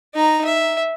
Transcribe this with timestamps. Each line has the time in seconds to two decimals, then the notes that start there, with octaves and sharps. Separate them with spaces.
0.14 D#4 A#5
0.45 E5